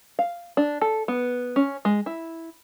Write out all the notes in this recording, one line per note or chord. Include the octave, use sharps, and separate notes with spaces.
F5
D4
A4
B3
C#4
G#3
E4